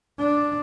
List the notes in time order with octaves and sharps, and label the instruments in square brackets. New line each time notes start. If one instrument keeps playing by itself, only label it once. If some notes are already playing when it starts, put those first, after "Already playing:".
[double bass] D4